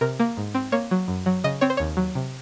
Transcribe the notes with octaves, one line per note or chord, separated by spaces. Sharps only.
C3 A#4
A#3
G#2
C4
A#3 C#5
F#3
F#2
F#3
C#3 D#5
C4 C#5
C5
D#2 C#5
F#3
C3